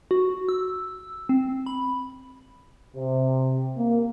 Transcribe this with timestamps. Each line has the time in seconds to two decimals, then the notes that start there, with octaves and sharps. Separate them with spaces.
0.11 F#4
0.49 E6
1.29 C4
1.66 B5
2.96 C3
3.77 A#3